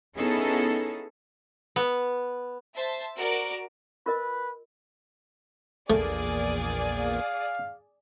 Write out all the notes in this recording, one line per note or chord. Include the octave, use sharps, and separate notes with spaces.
B3 C#4 D#4 E4 G#4 A4
B3
C5 E5 A5
F#4 A#4 D5
F4 A#4 B4 D#5
A#1 E2 A3 A#3 G#4 D5
F5